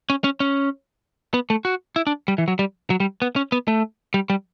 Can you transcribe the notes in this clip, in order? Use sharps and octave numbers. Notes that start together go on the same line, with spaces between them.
C#4
C#4
C#4
B3
A3
F#4
E4
D4
G3
E3
F#3
G3
F#3
G3
B3
C#4
B3
A3
G3
G3